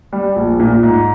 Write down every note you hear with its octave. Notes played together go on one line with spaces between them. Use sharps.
G3
A#1
A#2
G#2